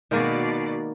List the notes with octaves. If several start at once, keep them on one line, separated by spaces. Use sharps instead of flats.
B2 D#3 G#3 A#3 F#4 D5